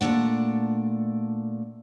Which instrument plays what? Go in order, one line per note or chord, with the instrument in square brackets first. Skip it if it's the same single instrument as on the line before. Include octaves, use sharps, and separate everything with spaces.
[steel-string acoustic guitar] A#2 G#3 A3 D4 F#5